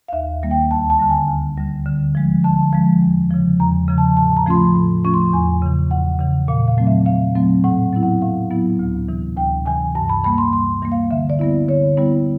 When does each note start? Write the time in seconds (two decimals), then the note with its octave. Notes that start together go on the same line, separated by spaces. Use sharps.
0.08 F5
0.12 D#2 E5
0.42 D#3 G3 A#3
0.51 G5
0.70 D2 A5
0.90 A5
0.99 D3 G3
1.10 G#5
1.28 D2
1.57 D3 G3
1.86 D3
2.15 F3 G#3
2.44 D3 A5
2.73 F3 G#3
3.02 E2
3.31 C#3 F3
3.59 E2 A#5
3.88 C#3 F3
3.98 A5
4.17 A2 A5
4.37 A#5
4.47 F3 A3 C#4 F4 C6
4.56 B5
4.75 A2
5.04 F3 A3 C#4 F4 C#6
5.14 C6
5.33 E2 G#5
5.62 C#3 E3
5.91 E2 F#5
6.19 C#3 E3
6.48 A#2 F5
6.68 F5
6.78 F#3 A3 C4
6.87 E5
7.06 A#2 F5
7.35 F#3 A3 C4
7.64 A2 F#5
7.93 F#3 B3 E4
8.03 F#5
8.22 A2 F5
8.51 F#3 B3 E4
8.79 D2
9.09 C3 E3
9.37 D2 G5
9.66 C3 E3 G#5
9.95 G2 A5
10.09 B5
10.24 E3 G3 A#3 B5
10.38 C6
10.53 G2 C6
10.82 E3 G3 A#3
10.92 F5
11.11 D3 E5
11.30 D5
11.39 G3 B3 E4
11.69 D3 C#5
11.97 G3 B3 E4